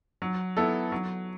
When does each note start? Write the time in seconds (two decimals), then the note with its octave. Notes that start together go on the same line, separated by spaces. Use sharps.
0.22 F#3
0.57 B3 E4 A4
0.92 F#3